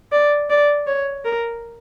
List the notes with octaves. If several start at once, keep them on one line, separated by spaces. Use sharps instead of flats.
D5
D5
C#5
A#4